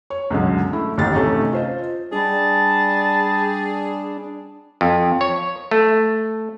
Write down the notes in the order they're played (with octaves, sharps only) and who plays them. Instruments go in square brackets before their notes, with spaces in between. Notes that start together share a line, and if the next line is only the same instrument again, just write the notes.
[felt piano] C#5
C#2 F#2 B2 D3
A3 E4
A1 D#2 D3 D#4 G4 A6
C3 A3 C#4 D#4
F4 C5 D#5
[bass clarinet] G3 [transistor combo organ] D4 [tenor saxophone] G#4 [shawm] A5
[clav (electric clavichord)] F2
C#5
A3